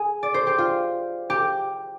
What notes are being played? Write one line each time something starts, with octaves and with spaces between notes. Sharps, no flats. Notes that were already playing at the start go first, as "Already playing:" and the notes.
Already playing: G#4
D5
C5
G4
F4
G4